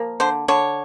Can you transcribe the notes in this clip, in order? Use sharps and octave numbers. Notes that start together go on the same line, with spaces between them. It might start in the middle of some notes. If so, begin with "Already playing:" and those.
Already playing: F3 A#3
D3 C5
D3 C#5